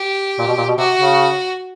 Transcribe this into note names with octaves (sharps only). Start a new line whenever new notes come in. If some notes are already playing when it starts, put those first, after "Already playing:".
Already playing: G4
A#2
B2
A#2
B2
C3 F#4
C#3